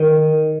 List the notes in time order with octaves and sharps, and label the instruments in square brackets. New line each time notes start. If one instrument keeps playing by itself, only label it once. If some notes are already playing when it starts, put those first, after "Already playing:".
Already playing: [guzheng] D#3